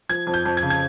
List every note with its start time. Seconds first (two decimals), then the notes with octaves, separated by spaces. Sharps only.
0.09 F3 G#6
0.27 F2
0.34 G6
0.45 F2
0.57 G#6
0.63 C#3
0.70 G#6